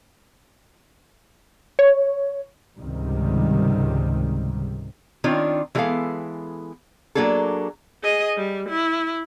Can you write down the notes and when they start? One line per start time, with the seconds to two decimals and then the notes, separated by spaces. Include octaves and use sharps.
1.79 C#5
2.78 C#2 G#2 C3 D#3 G3
5.24 D#3 C4 D4 F4 C#5
5.75 E3 G3 G#3 B3 A4 F5
7.15 F#3 A#3 D4 G#4 A4
8.03 G#4 D#5
8.37 G3
8.69 E4